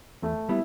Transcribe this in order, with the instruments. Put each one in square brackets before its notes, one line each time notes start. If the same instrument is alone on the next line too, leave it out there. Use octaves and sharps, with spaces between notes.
[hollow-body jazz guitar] E2 [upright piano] A3
[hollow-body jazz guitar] G3 B3 [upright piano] E4